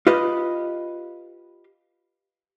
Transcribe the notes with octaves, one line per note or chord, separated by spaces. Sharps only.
F4 G4 B4 D#5